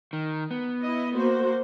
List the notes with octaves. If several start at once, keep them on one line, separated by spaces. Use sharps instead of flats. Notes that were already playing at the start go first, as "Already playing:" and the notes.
D#3
B3
E4 D#5
A#3 F#4 C5